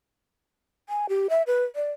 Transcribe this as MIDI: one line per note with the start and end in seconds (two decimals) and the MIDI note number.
0.89 1.06 80
1.09 1.27 67
1.30 1.42 76
1.47 1.64 71
1.76 1.91 74